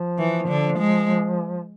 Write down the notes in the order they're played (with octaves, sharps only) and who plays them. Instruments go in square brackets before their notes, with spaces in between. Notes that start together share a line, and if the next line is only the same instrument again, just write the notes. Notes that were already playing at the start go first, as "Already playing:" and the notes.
Already playing: [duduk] F3
[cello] E3
D3
G#3